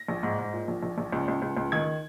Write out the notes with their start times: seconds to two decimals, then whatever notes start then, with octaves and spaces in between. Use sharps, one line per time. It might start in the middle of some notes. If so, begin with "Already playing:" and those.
Already playing: A#6
0.09 A#1
0.23 G#2
0.39 G#2
0.53 A#2
0.68 A#1
0.83 A#1
0.98 A#1
1.12 C#2
1.28 C#2
1.42 C#2
1.57 C#2
1.72 D#3 G#6